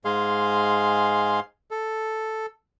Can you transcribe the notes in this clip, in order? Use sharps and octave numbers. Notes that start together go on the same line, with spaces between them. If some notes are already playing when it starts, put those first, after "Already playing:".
G#2 G#3 G#4 F5 C6
A4